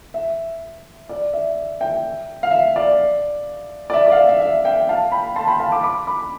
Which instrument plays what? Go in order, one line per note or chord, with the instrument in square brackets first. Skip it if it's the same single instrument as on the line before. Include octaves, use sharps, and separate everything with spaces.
[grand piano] E5
D5
E5
E5 G5
F5
E5
D5
D5
E5
D5
F5
E5
E5
E5
E5 G5
F5 A5
G5 B5
A5 C6
G5 B5
F5 A5
B5 D6
B5 D6
B5 D6